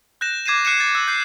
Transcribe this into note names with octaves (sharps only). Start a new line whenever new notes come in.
F#6 G6 A#6 E7
D6 G#6 C7 D#7 E7
F#6 C7 C#7 D#7 E7
A6
E6 F#6
G6 C7